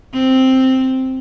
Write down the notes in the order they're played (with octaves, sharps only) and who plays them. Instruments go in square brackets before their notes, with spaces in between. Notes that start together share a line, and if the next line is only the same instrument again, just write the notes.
[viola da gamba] C4